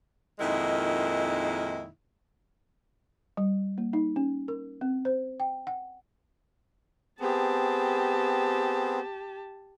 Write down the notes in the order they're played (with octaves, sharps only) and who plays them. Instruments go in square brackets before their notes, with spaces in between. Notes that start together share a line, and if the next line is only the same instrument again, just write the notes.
[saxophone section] F2 A#2 D#3 G#3 D#4 E4
[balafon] G3
A#3
D#4
C#4
A#4
C4
C5
G5
F#5
[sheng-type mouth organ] B3 C4 G#4 [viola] G4 A5